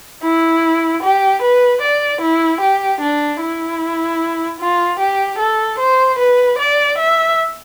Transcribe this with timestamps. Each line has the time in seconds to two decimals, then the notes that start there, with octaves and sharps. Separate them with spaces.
0.23 E4
1.03 G4
1.42 B4
1.82 D5
2.21 E4
2.61 G4
3.01 D4
3.41 E4
4.60 F4
4.99 G4
5.39 A4
5.79 C5
6.19 B4
6.58 D5
6.98 E5